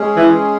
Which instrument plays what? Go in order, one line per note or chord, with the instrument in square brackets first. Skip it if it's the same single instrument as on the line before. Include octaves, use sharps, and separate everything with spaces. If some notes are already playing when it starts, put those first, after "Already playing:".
Already playing: [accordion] G#3 C#4 G#4
[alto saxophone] E3